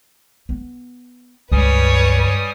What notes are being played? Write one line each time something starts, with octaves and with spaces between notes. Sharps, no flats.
B3
C#2 G2 G3 B4 C#5 G#5 D#6